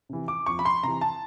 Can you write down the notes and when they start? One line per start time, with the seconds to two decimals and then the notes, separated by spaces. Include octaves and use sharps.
0.09 C3 E3
0.28 D6
0.46 F2 C#6
0.59 B5
0.65 C6
0.83 C3 E3 A#5
1.01 A5